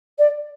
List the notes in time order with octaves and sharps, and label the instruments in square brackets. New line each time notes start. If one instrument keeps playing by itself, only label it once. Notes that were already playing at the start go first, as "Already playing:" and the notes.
[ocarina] D5